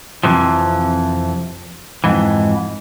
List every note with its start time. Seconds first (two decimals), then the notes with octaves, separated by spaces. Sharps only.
0.24 F2 A2 C3 E3 F3
2.04 F2 G#2 E3